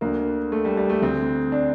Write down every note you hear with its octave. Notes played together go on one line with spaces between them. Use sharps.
D2 D3 A#3
A3
G3
G3
A3
D2 D3 C4
D4